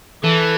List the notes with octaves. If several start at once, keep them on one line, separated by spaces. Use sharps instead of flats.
E3 A4